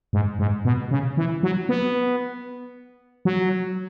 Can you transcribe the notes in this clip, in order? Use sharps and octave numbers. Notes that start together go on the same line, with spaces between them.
G#2
G#2
B2
C#3
E3
F#3
B3
F#3